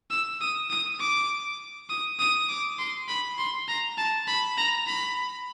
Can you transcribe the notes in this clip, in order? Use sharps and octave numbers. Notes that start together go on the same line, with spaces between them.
E6
D#6
D#6
D6
D#6
D#6
D6
C6
B5
C6
A#5
A5
B5
A#5
B5